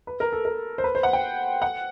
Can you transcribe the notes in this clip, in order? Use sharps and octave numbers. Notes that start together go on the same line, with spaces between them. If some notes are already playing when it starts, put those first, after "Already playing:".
B4
A#4
A4
A#4
C5
B4
C5
F#5
G5
F#5